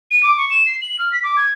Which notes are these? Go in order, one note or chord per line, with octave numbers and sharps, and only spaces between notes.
D#7
D6
C#6
E7
C7
F#7
F6
B6
D6
G#6